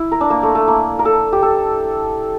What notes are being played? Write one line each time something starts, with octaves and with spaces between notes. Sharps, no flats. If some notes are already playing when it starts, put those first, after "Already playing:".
Already playing: E4
A#4
D4
A#3
A3
A3
A#3
A#4
A4
G4
A4